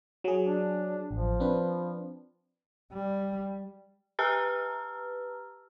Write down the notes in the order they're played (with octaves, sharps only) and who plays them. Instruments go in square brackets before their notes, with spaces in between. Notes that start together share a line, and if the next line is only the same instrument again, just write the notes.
[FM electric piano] F#3 G#4
[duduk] D4
[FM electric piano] A1 [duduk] F3
[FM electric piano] C4 D4 B4
[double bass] G3
[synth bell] G4 B4 A5 A#5 E6 F6